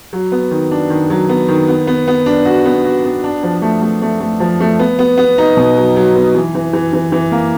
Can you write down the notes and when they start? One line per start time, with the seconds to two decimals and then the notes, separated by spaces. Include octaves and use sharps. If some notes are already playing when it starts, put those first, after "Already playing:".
0.13 F#3
0.32 B3
0.51 D#3
0.72 D4
0.90 D#3
1.10 F#3
1.29 B3
1.48 D#3
1.68 B3
1.87 B3
2.08 B3
2.26 D4
2.45 F#4
2.66 B3
2.85 F#4
3.04 B3
3.24 D4
3.43 F3
3.62 A3
3.82 A3
4.02 A3
4.20 A3
4.40 F3
4.60 A3
4.79 B3
4.99 B3
5.18 B3
5.38 D#4
5.57 B2
5.77 F#3
5.96 F#3
6.15 B3
6.35 E3
6.55 E3
6.73 E3
6.93 E3
7.12 E3
7.32 A#3